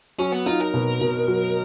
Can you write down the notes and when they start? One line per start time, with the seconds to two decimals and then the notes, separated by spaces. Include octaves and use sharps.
0.19 F#3 C#4
0.32 B3
0.46 D#4 F4
0.60 A#4
0.74 B2
1.01 B2
1.28 F#3